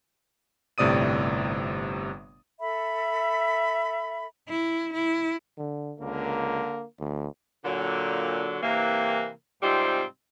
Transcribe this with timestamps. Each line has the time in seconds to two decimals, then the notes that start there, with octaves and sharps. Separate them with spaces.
0.78 G1 A2 C3 D5 D#6 D#7
2.60 A4 E5 B5
4.49 E4
4.94 E4
5.58 D3
6.00 C#2 D3 A#3
7.00 D2
7.65 A#2 D3 F#3
8.62 C3 E3 A#3
9.62 G#2 C3 G3 C4 D#4 F4